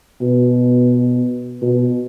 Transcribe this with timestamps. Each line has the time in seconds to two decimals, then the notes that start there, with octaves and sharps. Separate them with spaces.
0.21 B2
1.62 B2